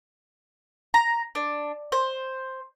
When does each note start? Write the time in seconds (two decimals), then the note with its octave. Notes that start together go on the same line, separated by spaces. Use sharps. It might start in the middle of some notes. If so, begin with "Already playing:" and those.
0.94 A#5
1.35 D4
1.92 C5